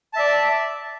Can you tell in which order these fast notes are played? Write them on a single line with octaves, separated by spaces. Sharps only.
A5 E5 D5